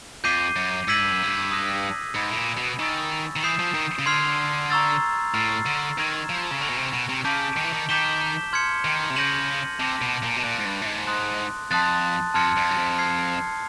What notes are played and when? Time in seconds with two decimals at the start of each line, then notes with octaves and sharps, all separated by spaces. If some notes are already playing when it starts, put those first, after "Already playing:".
0.24 F2 D6 G6 C7 D#7 G7
0.56 F#2
0.88 G#2 E6 G#6 B6 D#7 F#7
1.00 G2
1.11 F#2
1.23 G2
1.51 D#6 F#6 A#6
2.15 G#2 B5 E6 G#6 C#7
2.31 A2
2.37 A#2
2.57 B2
2.79 D#3 G#5 C#6 E6 A6
3.36 D#3
3.43 E3 D#6 G6 C7 E7
3.59 F3
3.74 D#3
3.99 C#3
4.06 D3 C6 F6 G#6 C7 F7
4.70 A#5 C#6 E6 A6
5.34 A2 F6 A6 C7
5.66 D3
5.98 D#3 C#6 E6 G#6 C7 E7
6.30 F3
6.51 C#3
6.61 D3 G#5 C#6 F6 A#6 C#7
6.70 B2
6.77 C3
6.93 B2
7.09 C3
7.24 C#3 A5 D6 G6 B6 D7
7.57 D#3
7.64 E3
7.73 D#3
7.89 D#3 D6 G6 B6 E7 G7
8.53 C6 F6 G#6 C#7
8.85 D#3
9.10 C3
9.16 C#3 G6 A#6 D#7 F#7
9.79 C3 A5 D6 F#6 A#6
10.01 B2
10.22 A#2
10.36 B2
10.43 A#2 F#6 A6 D7
10.58 G#2
10.65 G2
10.82 A2
10.86 G#2
11.07 C6 D#6 F#6
11.71 F2 A5 C6 D#6 F#6 A6
12.34 F2 A5 C6 F6 G#6 C#7
12.56 F2
12.70 F#2
12.77 F2
12.99 F6 G#6 C7